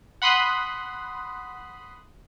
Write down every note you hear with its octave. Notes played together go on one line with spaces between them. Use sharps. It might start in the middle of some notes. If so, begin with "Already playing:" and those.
F#5 B5 C6 D#6 F#6